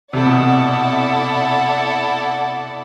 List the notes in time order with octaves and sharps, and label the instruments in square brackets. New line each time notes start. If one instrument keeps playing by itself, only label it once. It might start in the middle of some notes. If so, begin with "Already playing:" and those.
[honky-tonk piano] C3 [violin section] E4 A4 D5 F#5
[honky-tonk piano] B2
C3